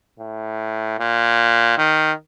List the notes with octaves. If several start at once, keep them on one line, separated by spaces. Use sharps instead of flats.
A2
A#2
D#3